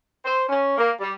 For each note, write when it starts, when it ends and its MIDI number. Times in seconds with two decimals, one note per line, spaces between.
0.25 0.44 72
0.49 0.74 61
0.78 0.92 58
1.00 1.13 55